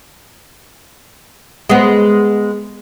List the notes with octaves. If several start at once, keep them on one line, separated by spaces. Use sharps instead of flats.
G#3 B3